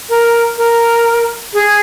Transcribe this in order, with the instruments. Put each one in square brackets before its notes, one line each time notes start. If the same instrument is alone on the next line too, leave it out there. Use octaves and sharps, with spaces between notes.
[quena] A#4
A#4
G#4